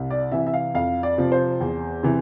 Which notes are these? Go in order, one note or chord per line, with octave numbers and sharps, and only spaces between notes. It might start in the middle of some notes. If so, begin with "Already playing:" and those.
Already playing: C2
D5
C3 E3 E5
E5
F5
F2 F5
D5
C3 F3
C5
E2
C3 E3